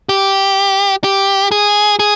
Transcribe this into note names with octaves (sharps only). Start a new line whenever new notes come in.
G4
G4
G#4
G#4